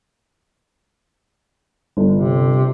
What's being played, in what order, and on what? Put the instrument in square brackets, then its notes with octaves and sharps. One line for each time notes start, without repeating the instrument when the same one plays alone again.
[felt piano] G1
[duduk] C3